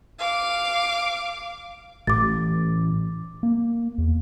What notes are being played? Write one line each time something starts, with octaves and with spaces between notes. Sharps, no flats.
F5 D6
A1 D6 A6
A#3
E2